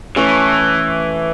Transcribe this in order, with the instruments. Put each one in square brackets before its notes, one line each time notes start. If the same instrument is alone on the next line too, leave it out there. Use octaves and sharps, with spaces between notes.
[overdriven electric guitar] E3 [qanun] A3 C#4